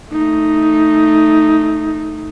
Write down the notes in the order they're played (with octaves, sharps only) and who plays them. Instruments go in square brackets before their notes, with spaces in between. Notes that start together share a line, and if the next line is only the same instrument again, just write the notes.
[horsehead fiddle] A3 D#4